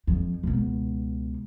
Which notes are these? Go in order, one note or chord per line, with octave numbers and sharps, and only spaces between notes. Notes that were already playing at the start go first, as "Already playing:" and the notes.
F2
C#2 B2